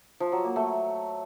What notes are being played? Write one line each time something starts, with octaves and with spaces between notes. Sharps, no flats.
F3
F#3
A#3
A3